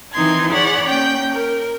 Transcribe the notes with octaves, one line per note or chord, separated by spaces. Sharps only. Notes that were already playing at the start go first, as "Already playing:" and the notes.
D#3 E3 C4 D#4 C6 G#6
G#4 C#5 D5 F#5 B5
A#3 C#4 G5 G6
A#4